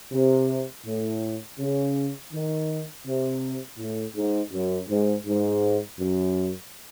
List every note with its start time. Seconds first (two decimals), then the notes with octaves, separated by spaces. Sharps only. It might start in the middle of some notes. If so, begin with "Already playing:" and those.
0.13 C3
0.86 A2
1.59 C#3
2.32 D#3
3.06 C3
3.79 A2
4.16 G#2
4.52 F#2
4.89 G#2
5.26 G#2
5.99 F#2